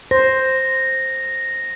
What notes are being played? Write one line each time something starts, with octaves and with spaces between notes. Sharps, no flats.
C5 A#6